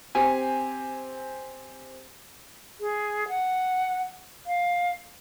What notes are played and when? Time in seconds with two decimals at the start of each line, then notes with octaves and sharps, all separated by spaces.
0.15 C4 G4 G#5
2.80 G#4
3.29 F#5
4.47 F5